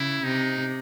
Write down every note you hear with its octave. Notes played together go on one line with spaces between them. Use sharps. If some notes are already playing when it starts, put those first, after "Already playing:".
Already playing: C#3 E4
C3 D#4